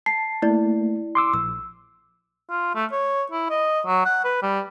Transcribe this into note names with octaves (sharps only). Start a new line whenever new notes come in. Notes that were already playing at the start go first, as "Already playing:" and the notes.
A5 C7
A3 A#3 E4 D5
C6 D6 E6
A#1 E6
F4
A3
C#5
E4
D#5
F#3
F#5
B4
G3